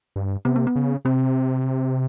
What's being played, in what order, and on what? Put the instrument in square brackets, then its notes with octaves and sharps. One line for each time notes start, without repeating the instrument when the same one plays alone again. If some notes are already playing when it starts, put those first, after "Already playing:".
[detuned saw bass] G2
[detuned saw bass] C3 [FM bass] B3
[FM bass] A#3
B3
[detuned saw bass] C#3
[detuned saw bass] C3 [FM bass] C4